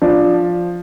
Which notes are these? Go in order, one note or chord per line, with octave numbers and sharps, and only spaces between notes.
F3 D4